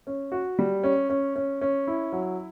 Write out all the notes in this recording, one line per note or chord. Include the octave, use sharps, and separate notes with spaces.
C#4
F#4
G3
C#4
C#4
C#4
C#4
E4
F#3